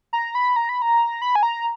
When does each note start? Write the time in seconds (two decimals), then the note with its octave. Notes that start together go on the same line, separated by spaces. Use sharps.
0.13 A#5
0.35 B5
0.56 A#5
0.69 B5
0.82 A#5
1.22 B5
1.35 G#5
1.43 A#5